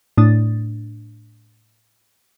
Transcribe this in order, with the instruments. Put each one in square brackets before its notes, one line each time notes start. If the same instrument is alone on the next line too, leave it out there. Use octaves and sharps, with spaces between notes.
[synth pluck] A2 D4 D#6 A6